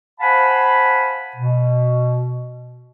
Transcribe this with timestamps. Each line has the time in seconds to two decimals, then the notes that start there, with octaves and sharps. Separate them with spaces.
0.20 C5 F5 F#5 G#5 A5 B5
1.36 B2